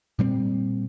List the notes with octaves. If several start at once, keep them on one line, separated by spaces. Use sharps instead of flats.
A#2 G3 B3 C4